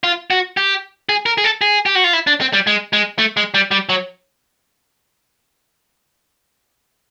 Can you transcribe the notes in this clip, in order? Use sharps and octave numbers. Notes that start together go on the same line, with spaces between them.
F4
F#4
G4
G#4
A#4
G#4
A4
G#4
G4
F#4
F4
E4
D4
C4
G3
G#3
G#3
A3
G#3
G3
G3
F#3